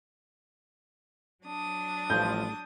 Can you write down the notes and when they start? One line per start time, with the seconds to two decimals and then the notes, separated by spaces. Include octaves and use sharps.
1.44 F#3 D4 D#6
2.10 A1 A2 F3 G3 G6